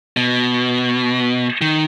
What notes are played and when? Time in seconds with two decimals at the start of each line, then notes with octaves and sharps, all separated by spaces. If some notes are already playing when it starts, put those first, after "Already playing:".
0.17 B2
1.61 D#3